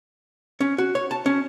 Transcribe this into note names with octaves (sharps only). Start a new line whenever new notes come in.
C#4
F#4
C#5
A5
C#4